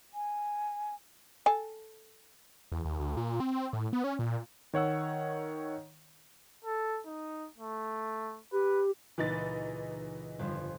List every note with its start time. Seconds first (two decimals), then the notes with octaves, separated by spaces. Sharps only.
0.14 G#5
1.46 A4 G#5
2.72 E2
2.85 D#2
2.99 D2
3.17 A#2
3.40 C4
3.73 A2
3.93 B3
4.04 C#4
4.19 A#2
4.74 D#3 C#5 F#5 E6
6.65 A4
7.06 D#4
7.58 A3
8.52 G4 B4
9.18 C#2 A#2 E3 D#4 B4 A6
10.39 G1 F2